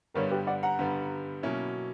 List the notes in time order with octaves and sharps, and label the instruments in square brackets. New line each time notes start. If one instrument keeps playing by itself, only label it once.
[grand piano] G2 D3 G3 B3 [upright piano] A#4 C#5
[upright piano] G4 B4
D5 F#5
F#5 A#5
[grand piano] G2 D3 G3 B3
B2 F#3 A#3 C#4 E4